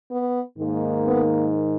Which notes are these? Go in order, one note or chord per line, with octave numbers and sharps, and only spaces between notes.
B3
G#2 D#3 A#3
B3